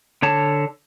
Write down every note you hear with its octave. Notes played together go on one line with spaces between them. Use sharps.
D3 C#5 A5